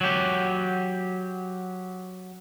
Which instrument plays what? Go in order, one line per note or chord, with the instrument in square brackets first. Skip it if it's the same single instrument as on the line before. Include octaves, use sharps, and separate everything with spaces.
[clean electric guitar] F#3 G4